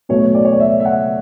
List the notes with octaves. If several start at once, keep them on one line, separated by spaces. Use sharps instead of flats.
B2 F#3 A3 C#5
D5
C#5
D5
E5
E5
F#5